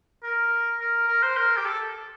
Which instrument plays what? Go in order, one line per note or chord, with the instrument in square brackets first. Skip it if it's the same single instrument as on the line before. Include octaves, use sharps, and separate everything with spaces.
[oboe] A#4
A#4
A#4
C5
A#4
G4
A4